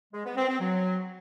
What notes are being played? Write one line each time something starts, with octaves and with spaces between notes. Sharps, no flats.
G#3
B3
C4
C4
F#3